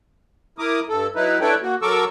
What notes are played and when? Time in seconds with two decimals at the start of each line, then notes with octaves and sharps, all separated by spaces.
0.58 E4 A#4 D6 D#6
0.89 G2 A4
1.15 F#3 D#4 E4 B4
1.41 D4 E4 A4 B4 C#5 G5
1.62 A#3 F#4
1.82 F#3 A4 A#4 C#6 D6 E6